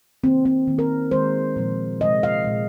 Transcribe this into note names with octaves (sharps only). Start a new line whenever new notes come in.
D#3 A#3 C4
C4
D#3 A#3
A#4
D#3 G#3 C5
A#2 F3 G#3
C3 G#3 D#5
F5
A#2 G#3